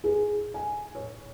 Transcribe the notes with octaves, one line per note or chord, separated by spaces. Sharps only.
G#4
G#5
C#5